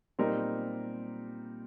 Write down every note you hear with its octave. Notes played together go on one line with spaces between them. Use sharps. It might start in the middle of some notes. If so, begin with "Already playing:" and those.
A#2 G3 C4 D#4 A#4